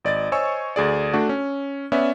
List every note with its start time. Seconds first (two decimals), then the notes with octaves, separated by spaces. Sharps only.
0.05 G#1 D5 D#5 A6
0.32 C5 C#5 D#5 G#5 C#6 E6
0.76 D2 G#4 D5
1.13 A3 D4 F#4
1.29 C#4
1.92 B3 C#4 D5 E5